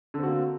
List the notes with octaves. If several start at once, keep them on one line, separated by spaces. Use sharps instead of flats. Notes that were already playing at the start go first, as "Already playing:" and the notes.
D3 A#3 C4 F#4